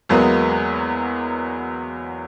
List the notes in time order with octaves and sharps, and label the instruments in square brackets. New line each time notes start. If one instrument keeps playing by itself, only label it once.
[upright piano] E2 F#3 G#3 A#3 B3